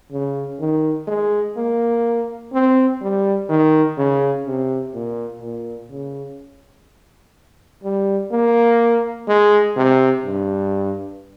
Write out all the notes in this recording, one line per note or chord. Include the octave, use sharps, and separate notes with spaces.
C#3
D#3
G#3
A#3
C4
G3
D#3
C#3
C3
A#2
A#2
C#3
G3
A#3
G#3
C3
G2